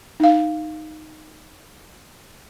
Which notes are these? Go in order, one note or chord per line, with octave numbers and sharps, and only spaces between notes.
D#4 F5